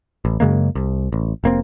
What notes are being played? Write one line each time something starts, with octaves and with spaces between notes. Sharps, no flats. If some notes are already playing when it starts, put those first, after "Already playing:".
A1
F#2 C#3 G#3 A#3
C2
A1
F1 A#3 C4